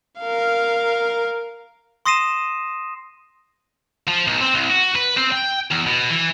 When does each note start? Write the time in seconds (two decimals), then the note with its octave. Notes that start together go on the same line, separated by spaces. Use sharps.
0.20 A#4 F5
2.06 C6 D#6 A#6 C7 D#7 E7
4.08 F3
4.27 B1
4.41 C4
4.54 C2
4.70 F#4
4.95 B4
5.17 C4
5.32 G5
5.71 E2
5.87 B2
6.11 E3